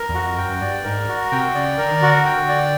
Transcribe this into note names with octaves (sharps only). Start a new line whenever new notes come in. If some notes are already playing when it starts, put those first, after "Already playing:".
Already playing: A#4
E2
F2 F#4
F#2 G5
G2 D5
G#2 A#4
F#4
C3 G5
C#3 D5
D3 A#4
D#3
D3 F#4
G5
D5